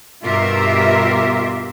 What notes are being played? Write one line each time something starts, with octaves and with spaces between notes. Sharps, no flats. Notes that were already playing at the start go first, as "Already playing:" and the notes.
G2 B2 F4 G4 A#4 E5